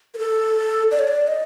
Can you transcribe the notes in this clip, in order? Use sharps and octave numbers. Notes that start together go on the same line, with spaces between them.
A#4
A4
D5
C#5
D5
D#5